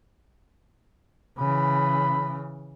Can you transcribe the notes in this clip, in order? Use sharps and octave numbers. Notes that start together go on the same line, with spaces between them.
C#3 E3 B5